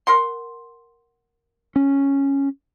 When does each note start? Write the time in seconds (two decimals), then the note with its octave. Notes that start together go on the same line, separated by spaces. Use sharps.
0.07 A#4 F#5 C6
1.76 C#4